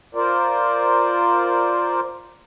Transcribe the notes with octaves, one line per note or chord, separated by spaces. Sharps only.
F4 A#4 C5 D5